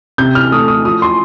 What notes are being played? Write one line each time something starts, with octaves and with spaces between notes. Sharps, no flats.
C3 G6
F6
A3 D#6
D#6
F3 D#6
C6